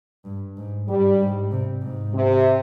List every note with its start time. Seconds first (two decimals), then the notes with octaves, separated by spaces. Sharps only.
0.25 G2
0.57 G#2
0.88 G2 G3
1.20 G#2
1.51 C3
1.83 G#2
2.15 C3